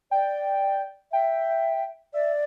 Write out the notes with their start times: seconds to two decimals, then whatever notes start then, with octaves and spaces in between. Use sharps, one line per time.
0.11 D5 G5
1.12 E5 G5
2.14 D5 E5